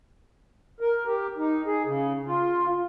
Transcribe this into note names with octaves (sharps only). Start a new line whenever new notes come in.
A#4
G4
D#4
G#4
C#3
F4